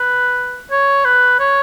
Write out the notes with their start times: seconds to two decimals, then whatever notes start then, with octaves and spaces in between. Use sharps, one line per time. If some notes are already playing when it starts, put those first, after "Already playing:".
Already playing: B4
0.71 C#5
1.05 B4
1.40 C#5